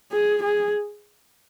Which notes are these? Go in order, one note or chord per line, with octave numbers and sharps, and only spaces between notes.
G#4
G#4